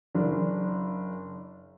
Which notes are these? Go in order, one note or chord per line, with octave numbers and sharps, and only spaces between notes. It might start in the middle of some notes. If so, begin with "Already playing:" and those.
F#1 D4